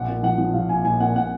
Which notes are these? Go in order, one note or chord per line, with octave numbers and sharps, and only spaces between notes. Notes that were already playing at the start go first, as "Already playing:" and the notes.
Already playing: A#1 F#5
A#2
F3 F#5
F3
F3 F5
A#1 G#5
A#1 G#5
A#2 F#5
A#2 F#5